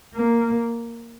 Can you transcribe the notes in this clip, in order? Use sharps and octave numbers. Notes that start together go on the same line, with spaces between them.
A#3